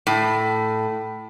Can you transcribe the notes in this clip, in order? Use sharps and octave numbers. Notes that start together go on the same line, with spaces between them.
A2